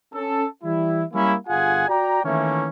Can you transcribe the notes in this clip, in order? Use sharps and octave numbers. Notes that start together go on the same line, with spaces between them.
C#4 A4
E3 G3 E4
G3 A#3 C#4 E4
G1 F4 G#4 F#5 G#5
F#4 D5 G5 A#5
D#3 E3 A3 A#3 C#4